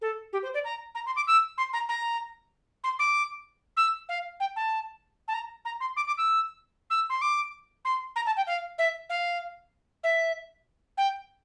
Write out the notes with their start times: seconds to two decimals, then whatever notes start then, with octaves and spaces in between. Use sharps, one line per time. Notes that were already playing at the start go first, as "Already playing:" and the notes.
0.02 A4
0.33 G4
0.43 C5
0.54 D5
0.65 A#5
0.95 A#5
1.06 C6
1.16 D6
1.27 E6
1.58 C6
1.73 A#5
1.89 A#5
2.84 C6
2.99 D6
3.77 E6
4.09 F5
4.40 G5
4.56 A5
5.28 A5
5.34 A#5
5.65 A#5
5.81 C6
5.97 D6
6.07 D6
6.18 E6
6.90 E6
7.10 C6
7.22 D6
7.85 C6
8.16 A#5
8.26 A5
8.37 G5
8.47 F5
8.78 E5
9.10 F5
10.04 E5
10.98 G5